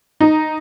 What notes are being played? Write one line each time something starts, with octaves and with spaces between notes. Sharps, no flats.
D#4